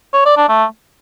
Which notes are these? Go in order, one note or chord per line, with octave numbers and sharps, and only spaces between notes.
C#5
D5
D4
A3